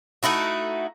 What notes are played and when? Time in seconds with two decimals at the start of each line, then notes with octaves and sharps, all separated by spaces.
0.23 A3 D#4 E4 F#4